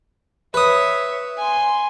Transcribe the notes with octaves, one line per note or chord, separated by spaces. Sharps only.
B4 C#5 E5 D#6
G#5 C6